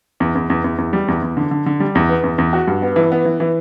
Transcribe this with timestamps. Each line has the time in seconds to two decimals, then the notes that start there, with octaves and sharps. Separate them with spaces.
0.20 E2
0.35 E2
0.50 E2
0.64 E2
0.78 E2
0.93 G3
1.08 E2
1.22 E2
1.37 D3
1.51 D3
1.66 D3
1.80 G3
1.95 E2
2.09 B3
2.24 E2
2.38 E2
2.53 F#4
2.67 G2
2.82 B3
2.96 E3
3.12 B3
3.25 E3
3.40 E3